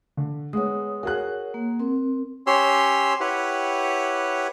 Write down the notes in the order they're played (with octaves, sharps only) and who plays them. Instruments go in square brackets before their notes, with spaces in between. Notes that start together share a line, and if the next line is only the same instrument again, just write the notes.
[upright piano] D3
[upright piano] G#3 B3 [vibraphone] C#5 D#6
[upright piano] F#4 G#4 F#6 [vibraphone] A#4 C#5
[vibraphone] A#3
C4 A#4
[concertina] C#4 G4 C#5 C6 E6
E4 G4 B4 C#5 F#5